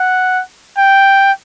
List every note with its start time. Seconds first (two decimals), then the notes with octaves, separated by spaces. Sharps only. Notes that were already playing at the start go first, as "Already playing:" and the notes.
Already playing: F#5
0.78 G5